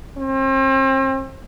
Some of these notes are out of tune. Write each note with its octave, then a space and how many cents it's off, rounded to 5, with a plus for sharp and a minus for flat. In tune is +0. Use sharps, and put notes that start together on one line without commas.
C4 +40